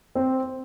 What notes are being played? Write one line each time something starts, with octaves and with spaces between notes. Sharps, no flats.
C4